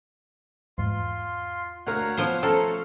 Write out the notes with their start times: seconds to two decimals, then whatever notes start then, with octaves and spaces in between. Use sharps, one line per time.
0.78 E2 G#2 F4 C6
1.87 D2 A#4 C#5 F5 F#5
2.17 F3 B3 C5
2.43 A3 C#4 A4 C5 F5 A#5 C#6